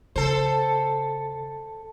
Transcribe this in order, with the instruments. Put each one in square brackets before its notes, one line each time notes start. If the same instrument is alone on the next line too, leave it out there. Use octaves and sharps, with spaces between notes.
[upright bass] C#3 [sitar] A4 C5